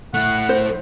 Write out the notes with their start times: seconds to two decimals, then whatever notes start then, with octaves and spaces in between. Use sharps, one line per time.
0.14 A3 E4 F#5
0.49 C5